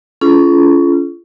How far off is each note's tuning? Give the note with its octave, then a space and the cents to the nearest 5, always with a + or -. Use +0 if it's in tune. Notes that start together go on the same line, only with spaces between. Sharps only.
C#4 +20 F4 -35 G#4 +45